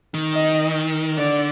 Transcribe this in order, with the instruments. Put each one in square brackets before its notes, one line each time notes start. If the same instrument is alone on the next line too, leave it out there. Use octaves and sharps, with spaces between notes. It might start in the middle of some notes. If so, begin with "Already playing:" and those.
[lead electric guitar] D#3
[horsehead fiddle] D#5
[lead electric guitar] D3 [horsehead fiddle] D5